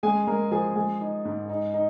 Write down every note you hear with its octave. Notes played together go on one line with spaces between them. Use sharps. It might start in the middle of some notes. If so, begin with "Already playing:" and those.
G#3 G#4 G#5
G#3 A#4 A#5
F3 G#4 G#5
G#3 G#4 G#5
D#4
G#2
D#4
D#4